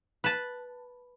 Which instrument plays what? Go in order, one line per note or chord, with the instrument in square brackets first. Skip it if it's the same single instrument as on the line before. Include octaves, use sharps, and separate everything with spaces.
[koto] B4 A5